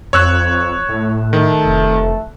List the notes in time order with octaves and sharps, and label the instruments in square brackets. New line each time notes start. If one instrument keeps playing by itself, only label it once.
[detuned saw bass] F2 [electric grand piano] C#5 E6 F#6
[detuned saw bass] A2
[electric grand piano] D#3 [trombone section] A3 A4
[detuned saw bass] F1